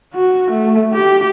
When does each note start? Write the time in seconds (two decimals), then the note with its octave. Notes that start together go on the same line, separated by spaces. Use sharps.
0.14 F#4
0.51 A3
0.94 G4